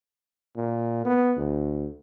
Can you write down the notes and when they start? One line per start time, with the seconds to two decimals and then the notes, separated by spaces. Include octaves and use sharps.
0.56 A#2
1.05 B3
1.37 D2